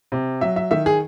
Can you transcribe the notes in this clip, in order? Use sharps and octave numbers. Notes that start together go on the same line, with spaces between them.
C3
F#3 E5
E5
D#3 E5
G#4